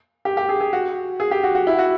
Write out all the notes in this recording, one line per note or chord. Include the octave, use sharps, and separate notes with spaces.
G4
G4
G#4
G#4
F#4
G#4
G4
F#4
F#4
E4
F#4